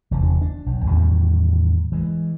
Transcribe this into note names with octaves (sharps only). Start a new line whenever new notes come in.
F1 E2 D3
D4
B1
E2 A2 D#3 G3
E3 G#3